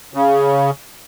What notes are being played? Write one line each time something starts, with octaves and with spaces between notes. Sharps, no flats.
C#3